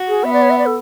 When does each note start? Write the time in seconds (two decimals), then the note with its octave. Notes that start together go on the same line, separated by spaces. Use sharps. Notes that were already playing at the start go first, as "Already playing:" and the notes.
Already playing: F#4
0.08 G#4
0.24 B3 E5
0.33 D5
0.42 C#5
0.50 E5
0.58 D5
0.66 A4